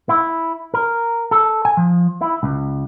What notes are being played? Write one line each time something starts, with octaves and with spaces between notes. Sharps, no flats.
E4
A#4
A4
G#5
F3
E4
C#2